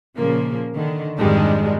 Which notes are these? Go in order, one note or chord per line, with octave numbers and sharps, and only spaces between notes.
A#2 C#3 F3 A#3
D3 D#3
F2 G#2 D#3 G3 G#3 D4